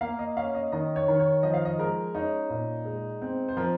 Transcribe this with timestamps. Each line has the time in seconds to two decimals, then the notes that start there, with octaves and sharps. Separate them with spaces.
0.01 A#3 F5
0.19 D#5
0.37 C#4 F5
0.55 D#5
0.72 D#3 D#5
0.96 C#5
1.08 D#3
1.20 C#5
1.43 F3 D#5
1.54 F5
1.65 D#5
1.79 G#3 A#4
2.15 C#4 D#4
2.50 A#2
2.85 G#3
3.22 C4
3.48 C5
3.57 F3 A#4